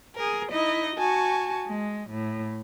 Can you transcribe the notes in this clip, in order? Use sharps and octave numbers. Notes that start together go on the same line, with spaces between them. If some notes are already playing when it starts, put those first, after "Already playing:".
G#4 A#4
D#4 E4 D#5
F#4 G#5 A5 C#6
G#3
A2